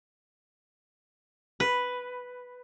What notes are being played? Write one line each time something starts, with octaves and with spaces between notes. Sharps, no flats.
B4